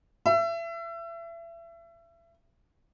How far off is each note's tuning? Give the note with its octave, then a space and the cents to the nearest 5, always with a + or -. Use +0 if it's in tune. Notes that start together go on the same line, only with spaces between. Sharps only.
E5 +30